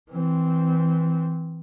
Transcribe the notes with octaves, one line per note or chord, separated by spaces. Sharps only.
E3 C4